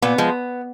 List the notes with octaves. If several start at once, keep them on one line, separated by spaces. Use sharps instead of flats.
A#2 B3
F3 G#3